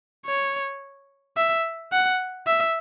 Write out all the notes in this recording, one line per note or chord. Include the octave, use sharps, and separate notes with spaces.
C#5
E5
F#5
E5